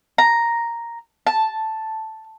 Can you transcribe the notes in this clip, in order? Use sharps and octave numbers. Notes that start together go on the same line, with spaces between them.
A#5
A5